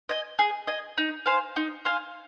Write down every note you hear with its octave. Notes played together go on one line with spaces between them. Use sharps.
D#5 G#5
G#4
D#5 G#5
D#4
C5 F5 G#5
D#4
C5 F5 G#5